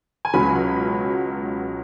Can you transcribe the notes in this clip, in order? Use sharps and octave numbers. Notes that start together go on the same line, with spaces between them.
G#5
C#2 B2 F#3 C#4 B5